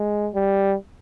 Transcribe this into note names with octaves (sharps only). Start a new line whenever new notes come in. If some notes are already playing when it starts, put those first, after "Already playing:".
Already playing: G#3
G3